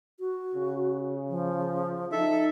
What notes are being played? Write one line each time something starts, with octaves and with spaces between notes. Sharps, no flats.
F#4
C#3
F3
D#4 A4 E5